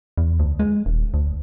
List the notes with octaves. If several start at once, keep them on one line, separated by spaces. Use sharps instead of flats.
E2
D2
G#3
D#1
D2